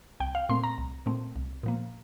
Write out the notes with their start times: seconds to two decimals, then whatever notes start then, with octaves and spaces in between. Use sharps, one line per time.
0.20 C2 G5
0.35 F5
0.49 A#2 A3 C4 C6
0.64 A#5
0.78 C2
1.06 A#2 A3 C4
1.36 C2
1.63 A#2 F3 A#3